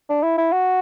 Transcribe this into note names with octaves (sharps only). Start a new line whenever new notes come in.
D4
E4
E4
F#4